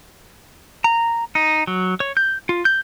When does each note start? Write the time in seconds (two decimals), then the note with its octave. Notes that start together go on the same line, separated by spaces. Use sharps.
0.84 A#5
1.35 D#4
1.67 F#3
2.00 C#5
2.17 G6
2.49 F4
2.65 G6